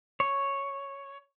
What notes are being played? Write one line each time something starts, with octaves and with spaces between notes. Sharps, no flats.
C#5